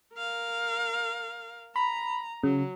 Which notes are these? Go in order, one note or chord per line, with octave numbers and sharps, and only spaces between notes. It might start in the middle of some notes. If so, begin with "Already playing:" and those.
A#4 F5
A#5 B5
C#3 F#3